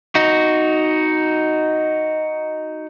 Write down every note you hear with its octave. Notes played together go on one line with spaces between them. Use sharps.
D#4 F#4